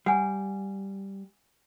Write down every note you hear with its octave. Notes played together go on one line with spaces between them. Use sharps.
G3 F#5 G#5